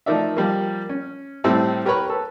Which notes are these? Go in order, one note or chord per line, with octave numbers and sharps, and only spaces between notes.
F3 A3 D#4 A#4 D5 E5
F3 G3 A#3
C#4
A2 G3 C4 E4 A4
G4 A#4 B4 C#5 B5 C#6
A4 B4